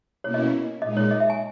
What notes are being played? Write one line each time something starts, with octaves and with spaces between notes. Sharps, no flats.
B2 A#3 C#4 E4 C#5
D#5
A#2 G#3 D#4 D#5
C#5
D#5
E5
G#5